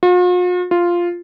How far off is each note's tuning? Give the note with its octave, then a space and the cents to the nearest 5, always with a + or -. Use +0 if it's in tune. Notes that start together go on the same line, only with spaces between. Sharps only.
F4 +45
F4 -5